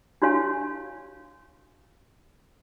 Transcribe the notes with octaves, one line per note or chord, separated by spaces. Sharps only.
D4 F#4 G4 C#5 F5 G#5